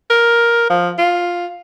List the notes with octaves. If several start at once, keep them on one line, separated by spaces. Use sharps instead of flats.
A#4
F3
F4